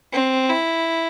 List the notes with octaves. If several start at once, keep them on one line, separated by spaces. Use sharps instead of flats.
C4
E4